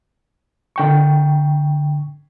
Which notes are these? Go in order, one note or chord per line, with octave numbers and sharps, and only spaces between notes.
D3 G5 C#6